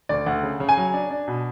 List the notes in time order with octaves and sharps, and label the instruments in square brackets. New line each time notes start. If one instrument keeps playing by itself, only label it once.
[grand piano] D2 D5
D2 F#5
C#3
C#3
G#5
F#3
D4
D4
B2